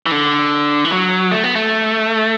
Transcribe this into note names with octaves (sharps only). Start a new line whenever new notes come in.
E3
D3
E3
F#3
A3
B3
A3